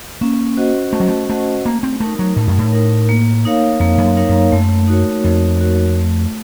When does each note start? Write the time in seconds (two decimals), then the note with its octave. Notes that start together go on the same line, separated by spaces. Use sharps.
0.21 A#3 C#4
0.57 F#4 C5 D#5 F#5
0.93 A3 C#4
1.00 F#3
1.08 A3
1.29 A3 F#4 C5 D#5 F#5
1.65 A3 A#3
1.83 C4
2.00 A3 D#4 A#4
2.19 F#3
2.36 A2 A3
2.47 F#2
2.58 A2
2.72 D#4 A#4
3.09 A#3
3.45 D#4 A#4 C#5 F5
3.80 F2 A#3
3.98 F2
4.05 F#2
4.17 D#4 A#4 C#5 F5
4.29 F#2
4.52 F#2 A3
4.88 D#4 F#4 A#4 C#5
5.24 F2 A3
5.59 D#4 F#4 A#4 C#5
5.96 A3